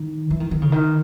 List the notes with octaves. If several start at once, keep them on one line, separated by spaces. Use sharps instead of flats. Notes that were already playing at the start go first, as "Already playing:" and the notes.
Already playing: D#3
E3
D#3
D#3
C#3
D#3